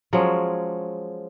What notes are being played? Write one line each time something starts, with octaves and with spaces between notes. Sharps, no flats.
F3 F#3 G#3 C#4